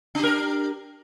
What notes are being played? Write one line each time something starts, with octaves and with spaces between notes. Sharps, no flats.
D4 G4 A#4